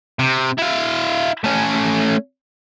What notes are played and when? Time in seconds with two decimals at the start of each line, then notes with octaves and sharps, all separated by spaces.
0.19 C3
0.59 E4 F5
1.44 A3 C#4